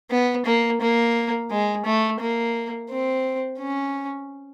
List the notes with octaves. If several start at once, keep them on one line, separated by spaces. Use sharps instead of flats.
B3
A#3
A#3
G#3
A3
A#3
C4
C#4